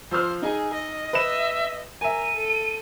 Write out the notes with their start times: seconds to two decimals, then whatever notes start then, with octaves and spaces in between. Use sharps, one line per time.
0.11 F3 C5 E6 F6
0.42 D#4 G#4 G#5
0.73 D#5
1.13 B4 E5 B5 E7
2.01 A#4 E5 G#5 D#7
2.36 A4